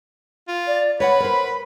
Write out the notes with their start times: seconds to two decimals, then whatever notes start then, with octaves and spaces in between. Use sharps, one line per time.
0.48 F4
0.67 D5
1.00 B4 C#5 D#5 F#5 B5
1.20 A#4 C5